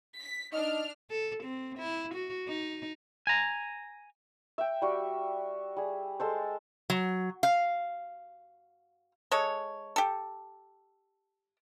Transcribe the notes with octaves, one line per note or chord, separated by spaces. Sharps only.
B6
D4 D#4 F6
A4
C4
E4
F#4
D#4
G#5 A#5
E5 G5
G3 F#4
G3 G#4
G#3 A4 C5
F#3
F5
G#3 A4 C#5
G4 A4